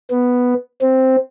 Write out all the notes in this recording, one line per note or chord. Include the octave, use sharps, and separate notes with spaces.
B3
C4